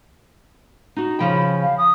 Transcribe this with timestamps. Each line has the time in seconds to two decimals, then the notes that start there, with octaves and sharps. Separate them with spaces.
0.96 D#4 F#4
1.19 C#3 F3 G5 B5
1.63 F5
1.78 D#6